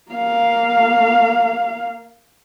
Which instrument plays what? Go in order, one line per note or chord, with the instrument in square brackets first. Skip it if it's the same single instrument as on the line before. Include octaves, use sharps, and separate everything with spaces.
[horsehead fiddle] A#3 F5